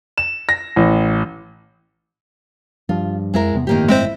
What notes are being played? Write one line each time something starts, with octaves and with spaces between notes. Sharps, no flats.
E7
A#6
A1
G2 F3 F4
F2 G#3 E4 A#4
E2 C3 B3
G1 F2 A2 D#3 A#3 G4
G#3 C4 E4 C5 E5